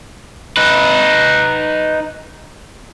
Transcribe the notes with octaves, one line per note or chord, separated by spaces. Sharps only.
D#4 B4